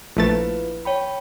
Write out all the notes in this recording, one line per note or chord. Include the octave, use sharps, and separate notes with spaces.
A#1 A3 E4 F4 B4 A6
C#5 G5 B5